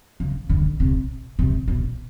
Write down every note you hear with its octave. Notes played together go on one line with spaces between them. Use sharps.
C#3
D3
C3
C3
B2